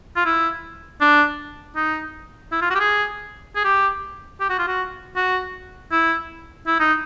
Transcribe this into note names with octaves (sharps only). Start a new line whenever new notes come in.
F4
E4
D4
D#4
E4
F4
F#4
G4
G#4
G#4
G4
G4
F#4
F4
F#4
F#4
E4
E4
D#4